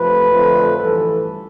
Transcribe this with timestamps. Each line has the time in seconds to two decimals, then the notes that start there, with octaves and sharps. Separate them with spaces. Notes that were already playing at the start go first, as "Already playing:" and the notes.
Already playing: F2 C3 F3 A3 B4
0.32 F2 D3 F3 A3
0.77 A1 G2 E3 G3 A4